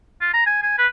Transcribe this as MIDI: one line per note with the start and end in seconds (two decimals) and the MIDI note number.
0.21 0.33 65
0.34 0.43 82
0.46 0.59 80
0.63 0.76 80
0.78 0.87 71